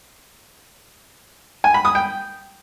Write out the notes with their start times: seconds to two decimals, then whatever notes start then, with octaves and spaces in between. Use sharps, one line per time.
1.64 G#5
1.74 B5
1.85 D#6
1.95 G5